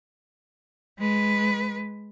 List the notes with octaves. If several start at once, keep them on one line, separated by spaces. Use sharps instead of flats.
G#3 B4